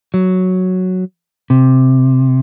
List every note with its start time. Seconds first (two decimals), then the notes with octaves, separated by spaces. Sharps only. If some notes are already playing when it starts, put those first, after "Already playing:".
0.14 F#3
1.50 C3